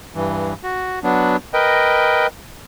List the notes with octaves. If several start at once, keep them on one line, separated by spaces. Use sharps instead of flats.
G2 E3
F#4
F#3 B3 D4
A#4 B4 D#5 G5